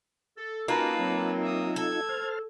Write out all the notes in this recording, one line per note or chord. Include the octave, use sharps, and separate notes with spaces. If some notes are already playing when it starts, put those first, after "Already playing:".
A4
A#3 C4 C#4 D#4 F4 F#4 B4 A5
F#3 C4
E5 D#6
A4 G#6
C5 A5 F6